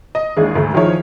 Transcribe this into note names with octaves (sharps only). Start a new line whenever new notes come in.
D#5
D#2 G#3 D4 E4 G#4
D2 G#2 A3
D#3 F3 D#4 E4 G#4 C#5